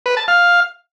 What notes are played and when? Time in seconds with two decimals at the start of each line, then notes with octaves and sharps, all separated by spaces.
0.06 B4
0.17 A5
0.28 F5